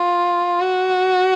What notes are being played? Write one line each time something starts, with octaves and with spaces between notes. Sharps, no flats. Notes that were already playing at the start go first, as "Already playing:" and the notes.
Already playing: F4
F#4